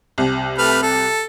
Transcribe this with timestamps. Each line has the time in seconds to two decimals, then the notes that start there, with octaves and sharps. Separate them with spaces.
0.18 C2 C3
0.58 A3 B4 F6
0.83 A4